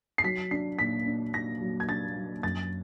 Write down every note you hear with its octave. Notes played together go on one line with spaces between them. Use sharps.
C7
F#3 B6
D4 C7
A#2 B6
D4
A#2 A#6
F#3
G#6
D4 A6
F#3
F#2 A6